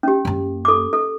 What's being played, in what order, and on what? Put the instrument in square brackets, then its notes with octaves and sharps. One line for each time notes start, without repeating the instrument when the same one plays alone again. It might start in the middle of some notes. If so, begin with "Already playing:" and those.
[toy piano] C#4 G4
[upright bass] F#2 A#3
[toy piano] A4 D6
A4